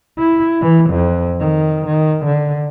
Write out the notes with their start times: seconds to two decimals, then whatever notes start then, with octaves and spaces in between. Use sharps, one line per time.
0.18 E4
0.61 E3
0.90 F2
1.40 D#3
1.87 D#3
2.26 D3